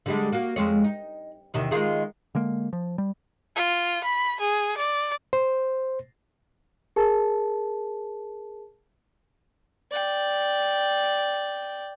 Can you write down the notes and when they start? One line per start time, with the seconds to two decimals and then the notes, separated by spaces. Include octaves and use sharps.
0.06 D3 G3 G#3
0.32 A#3 F#4
0.56 F2 G#3 C#5
0.84 D#4
1.54 E2 C3 D#3
1.71 D#3 G#3 F4
2.35 D3 G#3 A#3
2.73 F3
2.98 G3
3.56 F4
4.03 B5
4.40 G#4
4.77 D5
5.33 C5
6.96 G#4 A#4 A5
9.91 D5 G5